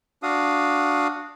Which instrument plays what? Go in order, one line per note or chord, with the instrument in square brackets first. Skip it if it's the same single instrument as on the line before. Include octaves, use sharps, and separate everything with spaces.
[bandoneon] D4 F#4 F5 D#6